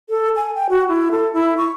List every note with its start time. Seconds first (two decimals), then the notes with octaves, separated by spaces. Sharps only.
0.09 A4
0.36 G#5
0.55 G5
0.69 F#4
0.88 E4
1.11 A4
1.33 E4
1.58 C#6